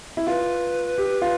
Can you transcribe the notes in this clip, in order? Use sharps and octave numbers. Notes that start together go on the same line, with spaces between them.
E4
F4 B4
G4
F4